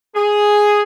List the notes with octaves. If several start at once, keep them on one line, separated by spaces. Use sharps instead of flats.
G#4